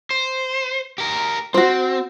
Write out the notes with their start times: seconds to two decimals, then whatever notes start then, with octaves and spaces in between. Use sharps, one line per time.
0.11 C5
0.98 G4 A#4
1.54 C4 F#4 C5